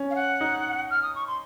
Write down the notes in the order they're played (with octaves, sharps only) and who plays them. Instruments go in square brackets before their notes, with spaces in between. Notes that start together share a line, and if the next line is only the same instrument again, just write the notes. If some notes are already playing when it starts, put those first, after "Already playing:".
Already playing: [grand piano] C#4
[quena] F5
F#5
[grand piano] D#4
[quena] F6
D#6
C#6
C6